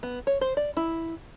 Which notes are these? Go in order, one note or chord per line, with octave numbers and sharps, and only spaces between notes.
B3
C#5
C5
D5
E4